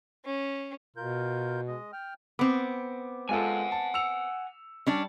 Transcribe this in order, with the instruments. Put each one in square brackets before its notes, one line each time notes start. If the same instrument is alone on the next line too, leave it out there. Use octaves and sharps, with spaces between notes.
[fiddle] C#4
[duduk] B2 [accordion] F4 A#4 G6
[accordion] G#3 D#5
G5 F6
[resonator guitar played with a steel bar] B3 C4 [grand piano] D6
[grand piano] G#3 F4 A4 [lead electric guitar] F#5 G#5
[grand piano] A5
E6 C#7 F7
[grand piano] G3 [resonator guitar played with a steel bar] C#4 D4 D5